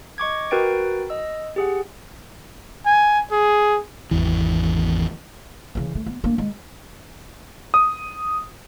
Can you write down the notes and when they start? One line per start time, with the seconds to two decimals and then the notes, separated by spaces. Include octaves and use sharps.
0.18 D#5 C#6 D6 G#6
0.51 F#4 A#4 B4 G5 A6 D7
1.10 D#5 E6
1.56 G4 G#4 F#5
2.86 G#5
3.32 G#4
4.11 G#1 E2 E3
5.75 C#3 E3
5.95 A3
6.06 B3
6.24 A#3 D4
6.38 G#3
7.74 D#6